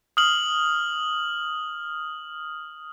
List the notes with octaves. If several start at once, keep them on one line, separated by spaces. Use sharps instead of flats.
D#6 F6 F#7